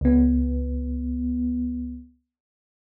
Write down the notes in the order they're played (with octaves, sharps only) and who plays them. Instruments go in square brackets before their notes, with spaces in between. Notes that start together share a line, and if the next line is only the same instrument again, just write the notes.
[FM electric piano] C#2 B3